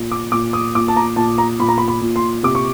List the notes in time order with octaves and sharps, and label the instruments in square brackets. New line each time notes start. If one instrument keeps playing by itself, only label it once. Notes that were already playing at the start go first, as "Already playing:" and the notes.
Already playing: [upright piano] A#2
D6
A#2 D6
D#6
A#2 D6
A5
A#5
A#2 A5
A#5
A#2 B5
A#5
B5
B5
A#2
C6
C3 D6
C#6